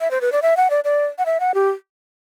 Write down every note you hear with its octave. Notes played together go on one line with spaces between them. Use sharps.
E5
C5
B4
D5
E5
F#5
D5
D5
F#5
E5
F#5
G4